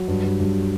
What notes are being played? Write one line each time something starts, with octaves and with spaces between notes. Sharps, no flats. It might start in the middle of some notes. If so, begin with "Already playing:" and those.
Already playing: F#3
G2
G2
G2